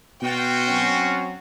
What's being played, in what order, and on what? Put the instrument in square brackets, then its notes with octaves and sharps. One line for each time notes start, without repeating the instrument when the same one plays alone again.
[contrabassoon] B2 [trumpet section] F4 F#4 [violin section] G5
[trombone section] F#3 C4 C#4